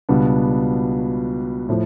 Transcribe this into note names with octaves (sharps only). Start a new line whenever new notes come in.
C#2 B2 G3 B3 D4
A2 F3 A3